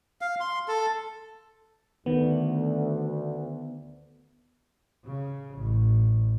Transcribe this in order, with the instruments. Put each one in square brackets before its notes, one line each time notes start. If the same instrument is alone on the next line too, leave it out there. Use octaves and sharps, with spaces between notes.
[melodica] F5
C6
A4
[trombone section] D2 [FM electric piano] D#3 B3
[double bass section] C#3
A1